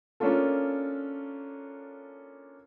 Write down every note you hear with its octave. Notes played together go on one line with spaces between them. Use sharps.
A#3 C#4 D4 F4 A4